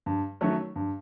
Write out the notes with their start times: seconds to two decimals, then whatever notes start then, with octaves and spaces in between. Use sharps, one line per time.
0.06 G2
0.41 D#3 F#3 A3 C#4
0.76 G2